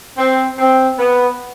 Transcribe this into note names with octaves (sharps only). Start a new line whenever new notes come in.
C4
C4
B3